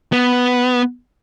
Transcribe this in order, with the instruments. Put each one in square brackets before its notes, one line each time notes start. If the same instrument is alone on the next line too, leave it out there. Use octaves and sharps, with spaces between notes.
[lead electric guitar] B3